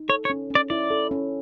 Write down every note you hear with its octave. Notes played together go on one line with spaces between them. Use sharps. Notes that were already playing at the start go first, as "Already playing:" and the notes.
Already playing: D#4
A4 C#5
C#5
C#4
C#4
D5
E4 D5
A4
C#4